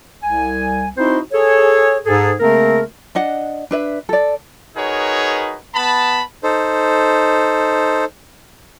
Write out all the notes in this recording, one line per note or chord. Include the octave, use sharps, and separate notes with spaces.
C2 G#5
C4 D#4 E4 F#4 C5
G#4 A4 C#5
G#2 G#4 A4
C#3 A3 A#3 C4 A#4
D4 D#5 F#5
D4 B4 E5
A4 D5
D#4 F#4 G#4 A#4 B4 C#5
B3 A5 B5
D#4 A4 C5